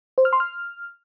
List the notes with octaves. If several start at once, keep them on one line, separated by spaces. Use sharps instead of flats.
C5
F6
C6
F6